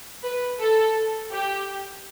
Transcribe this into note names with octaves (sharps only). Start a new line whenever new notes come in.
B4
A4
G4